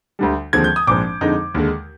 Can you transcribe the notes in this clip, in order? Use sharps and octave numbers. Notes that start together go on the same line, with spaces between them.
D2 D3 G3
D#2 D3 F3 G#3 C4 G#6
G6
D#6
A#1 G#2 F3 C4 D6
F2 D3 G#3 D#4
D#2 D3 G#3